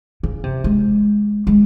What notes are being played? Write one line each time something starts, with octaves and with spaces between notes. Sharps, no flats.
C#3
C3
G#3
G#3